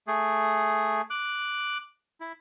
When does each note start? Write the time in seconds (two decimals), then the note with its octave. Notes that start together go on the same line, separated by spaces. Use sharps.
0.07 A3 G#4
1.10 D6 F#6
2.21 E4